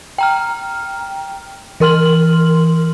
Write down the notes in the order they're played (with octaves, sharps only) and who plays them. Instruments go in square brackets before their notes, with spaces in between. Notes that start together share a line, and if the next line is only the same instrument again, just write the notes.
[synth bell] G5 A#5 F6
E3 A#4 C6 F6 F#7